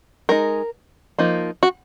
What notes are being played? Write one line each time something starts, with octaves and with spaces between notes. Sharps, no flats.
G#3 D#4 A#4
F3 A#3 D#4
F#4